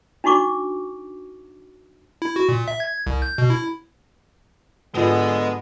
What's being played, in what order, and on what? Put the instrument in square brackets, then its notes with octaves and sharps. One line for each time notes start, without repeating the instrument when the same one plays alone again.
[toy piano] D4 D#4 F#4 C#6 D6
[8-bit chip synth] E4
F#4
A#2
E5
G#6
C2
G6
B2
E4
[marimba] G#2 F4 G#4 [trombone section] D3 B3 [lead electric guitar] G#3 D#5